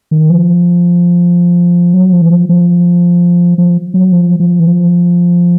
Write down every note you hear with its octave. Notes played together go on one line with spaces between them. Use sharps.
D#3
F3
F#3
F3
E3
F3
F3
F3
F#3
F3
F3
E3
F3